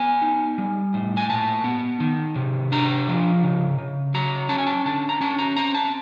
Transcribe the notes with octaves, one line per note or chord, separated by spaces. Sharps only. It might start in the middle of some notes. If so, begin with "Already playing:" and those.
Already playing: B3 G#5
D#4
G3
A2
G#5
A#2 A5
B3
D#3
C3
D4 A#5
F3
C#3
C#3
F#3 A#5
C#4 A5
G#5
A5
D3 A5
A#5
C#4 A5
A#5
C4 A#5
A5